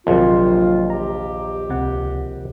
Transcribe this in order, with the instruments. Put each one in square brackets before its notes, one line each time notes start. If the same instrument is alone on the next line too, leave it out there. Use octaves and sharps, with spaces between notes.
[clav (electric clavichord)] A#1 D#2 [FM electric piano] C3 F#3 A#3 [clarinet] F4
[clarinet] G4 [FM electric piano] A#5
[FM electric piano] C#2 C3 F#5